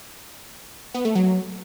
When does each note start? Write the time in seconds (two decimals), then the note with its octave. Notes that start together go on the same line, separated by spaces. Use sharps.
0.94 B3
1.05 A3
1.15 F#3